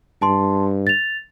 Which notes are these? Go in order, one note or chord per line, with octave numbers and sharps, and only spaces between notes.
G2 A5 C6
A6 F7